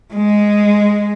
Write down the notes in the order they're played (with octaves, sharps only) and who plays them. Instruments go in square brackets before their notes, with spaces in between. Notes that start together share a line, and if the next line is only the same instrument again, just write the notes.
[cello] G#3